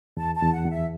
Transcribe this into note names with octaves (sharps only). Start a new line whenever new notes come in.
E2 A5
A5
E2
F#5
E2
E5